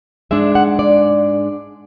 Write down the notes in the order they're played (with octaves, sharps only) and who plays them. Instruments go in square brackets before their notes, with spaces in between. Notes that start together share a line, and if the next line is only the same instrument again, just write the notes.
[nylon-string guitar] G#2 G#3 D4 E5
F#5
D5